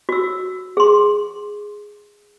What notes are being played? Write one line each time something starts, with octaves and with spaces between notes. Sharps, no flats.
F#4 E6
G#4 C6